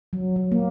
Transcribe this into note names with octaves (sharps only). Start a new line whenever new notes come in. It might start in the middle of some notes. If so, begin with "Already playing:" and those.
F#3
F#3
A#3